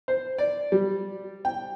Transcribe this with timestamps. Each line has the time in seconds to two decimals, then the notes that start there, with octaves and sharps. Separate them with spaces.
0.08 C5
0.38 D5
0.72 G3
1.45 G5